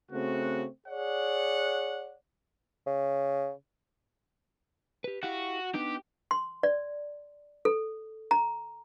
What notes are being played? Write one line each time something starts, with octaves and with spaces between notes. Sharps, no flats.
C#3 A3 C4 F#4
G#4 C#5 D5 F#5
C#3
G4 B4
E4 F#4 G4 F5
B3 D4 D#4 G4
C6
D5
A4
A#5